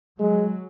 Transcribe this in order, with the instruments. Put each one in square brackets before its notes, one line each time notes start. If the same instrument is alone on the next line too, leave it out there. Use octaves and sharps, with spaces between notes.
[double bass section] F#3 [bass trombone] G#3